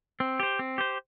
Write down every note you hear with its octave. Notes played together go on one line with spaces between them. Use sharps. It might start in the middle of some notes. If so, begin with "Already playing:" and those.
C4
G4 C5
C4
G4 C5